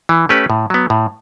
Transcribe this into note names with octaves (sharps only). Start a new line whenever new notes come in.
E3
A3 C#4 G4 B4
A2
F#3 B3
A2